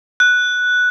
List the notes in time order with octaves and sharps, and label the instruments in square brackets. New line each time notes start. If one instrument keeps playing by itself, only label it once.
[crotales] F#6